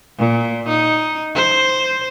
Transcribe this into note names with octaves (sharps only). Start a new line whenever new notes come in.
A#2
D#4
C5